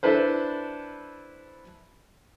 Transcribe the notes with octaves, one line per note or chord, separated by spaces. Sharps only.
D4 E4 A4 B4 C5